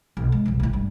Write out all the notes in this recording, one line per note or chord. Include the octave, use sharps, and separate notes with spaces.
B1
G#3
E1 C2
D2 A2
G2